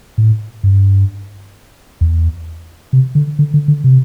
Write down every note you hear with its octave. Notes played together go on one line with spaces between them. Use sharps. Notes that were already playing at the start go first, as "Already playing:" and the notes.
A2
G2
E2
C3
D3
D3
D3
D3
C3